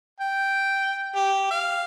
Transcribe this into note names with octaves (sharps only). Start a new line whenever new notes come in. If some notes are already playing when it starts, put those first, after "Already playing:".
G5
G4
F5